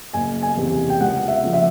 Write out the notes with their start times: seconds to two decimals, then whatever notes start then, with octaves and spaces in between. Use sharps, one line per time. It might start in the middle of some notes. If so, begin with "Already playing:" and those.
0.14 F#1 G#5
0.42 G#5
0.57 E2 C3
0.90 G5
1.00 C#2 F#5
1.28 E5
1.43 C#3 F3
1.53 E5